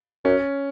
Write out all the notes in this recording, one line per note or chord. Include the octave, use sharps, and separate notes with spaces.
F#2 C#4